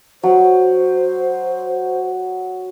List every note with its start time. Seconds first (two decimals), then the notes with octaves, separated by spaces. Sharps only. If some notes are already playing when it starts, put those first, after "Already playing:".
0.23 F#3 C5